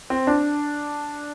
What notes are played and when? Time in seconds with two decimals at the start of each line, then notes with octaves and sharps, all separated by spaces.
0.10 C4
0.27 D4